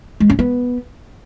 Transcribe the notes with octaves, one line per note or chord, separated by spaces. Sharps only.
G#3
C#4
B3